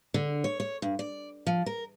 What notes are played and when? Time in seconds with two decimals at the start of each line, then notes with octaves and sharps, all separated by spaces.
0.14 D3
0.44 C#5
0.60 C#5
0.82 G2
0.99 D5
1.47 F3
1.66 A#4